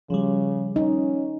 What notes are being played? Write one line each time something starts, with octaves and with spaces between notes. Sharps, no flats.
C#3 F3 G3
C#4 D#4